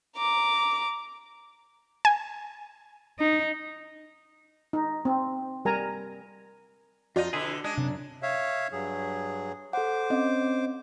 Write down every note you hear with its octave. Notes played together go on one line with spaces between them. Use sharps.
A#5 D6
G#5
D#4
D#4
C4
G3 A#4 G#5 A#5
F2 D#4 F4 F#4 D5 D#5
B2 D3 E4 G#4
G#3 D4
F#2 C3
C#5 E5 F5
G2 F#3 G#4
A4 C5 F#5 D6
C4 C#4 D#5